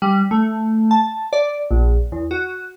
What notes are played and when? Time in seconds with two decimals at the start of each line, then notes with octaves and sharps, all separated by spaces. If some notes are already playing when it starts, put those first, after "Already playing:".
0.02 G3
0.31 A3
0.91 A5
1.33 D5
1.71 A#1
2.12 E2
2.31 F#4